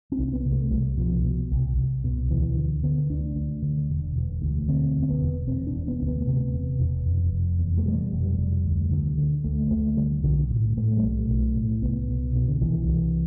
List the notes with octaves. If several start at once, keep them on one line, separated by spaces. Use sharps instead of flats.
C4
C2
B3
C3
A3
C2 G3
B2 F3
B2
C2
C2
B2
D2 E3
D3
D3 B3
D2 D4
D2
D3
E1
E1
D2
D3 C4
E1
C4
B3
E1
E1 C4
D4
E1
B3
D2
B3
C3
E1
E1
F1
F1
E2
A3
B2 G3
F1
G3
F1
D2
D3
D3
D2 A3
D2 A3
D3 G3
B1 D3
A2
A2 A3
G3
B1 A3
B1
A2
C2 B3
B2
B2
D3
C2 E3
C2